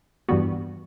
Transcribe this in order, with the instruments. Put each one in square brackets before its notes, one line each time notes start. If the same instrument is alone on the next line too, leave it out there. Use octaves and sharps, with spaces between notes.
[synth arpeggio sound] G2 E3 G3 B3 F#4